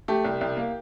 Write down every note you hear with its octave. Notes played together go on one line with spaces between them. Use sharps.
A3 G4
C2
C2
A#3